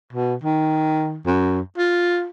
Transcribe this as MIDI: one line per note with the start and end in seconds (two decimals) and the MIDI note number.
0.13 0.35 47
0.43 1.19 51
1.26 1.60 42
1.78 2.28 65